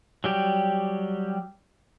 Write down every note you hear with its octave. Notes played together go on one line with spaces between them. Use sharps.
F#3 G3 G4